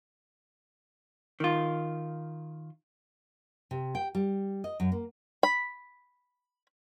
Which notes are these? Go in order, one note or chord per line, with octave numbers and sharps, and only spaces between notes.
D#3 F4
C3
G5
G3
D#5
F#2
A#3
B5